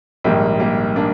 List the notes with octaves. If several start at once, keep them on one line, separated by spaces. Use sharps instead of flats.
A#1 G#2 D#3 G3 A#3
G3 A#3
A#3 D4